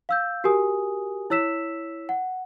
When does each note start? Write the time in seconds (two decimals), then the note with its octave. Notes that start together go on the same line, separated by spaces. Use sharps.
0.09 F5 E6 G6
0.44 F#4 G4 A#4 G#5 D#6
1.30 E4 C#5 E6 B6 E7
2.09 F#5